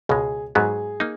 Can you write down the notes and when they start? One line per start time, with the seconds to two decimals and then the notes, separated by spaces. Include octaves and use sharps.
0.09 C#2 B2 G#3 G#4
0.55 G#2 F#3 B3 G#4
1.00 A#3 D#4